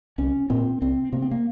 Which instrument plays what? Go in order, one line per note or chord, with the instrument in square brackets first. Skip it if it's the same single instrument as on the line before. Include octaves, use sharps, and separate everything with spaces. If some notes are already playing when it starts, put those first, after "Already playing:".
[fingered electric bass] C2 C#4
A#2 C4
C2 C4
C3 A#3
C4
A#3